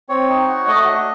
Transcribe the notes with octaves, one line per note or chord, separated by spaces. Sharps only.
C4 C#5
D#4
F#4
A3 D#5
D4